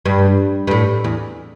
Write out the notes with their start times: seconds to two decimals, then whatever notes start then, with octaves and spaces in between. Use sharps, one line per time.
0.05 G2
0.67 G2
0.71 A2
1.04 E2